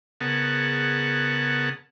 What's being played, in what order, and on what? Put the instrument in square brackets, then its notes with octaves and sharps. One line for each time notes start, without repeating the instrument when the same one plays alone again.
[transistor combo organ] C#3 B3 G#4 A#4 F#5 A5